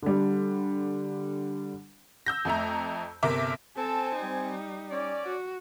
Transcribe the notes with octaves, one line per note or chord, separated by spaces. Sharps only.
D3 G3
E6 G6 A#6
F2 A3 A#5
G1 C3 A#4 E5 D6
C4 A4 G#5 A5
G3 D#4
C#4 D5
F#4